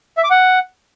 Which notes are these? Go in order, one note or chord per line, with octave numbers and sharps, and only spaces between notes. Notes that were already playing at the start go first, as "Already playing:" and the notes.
E5
D6
F#5